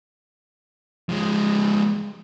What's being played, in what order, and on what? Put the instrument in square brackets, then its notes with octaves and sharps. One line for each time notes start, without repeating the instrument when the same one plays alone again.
[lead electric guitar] F3 G#3